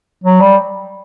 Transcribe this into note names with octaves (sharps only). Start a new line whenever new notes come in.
F#3
G3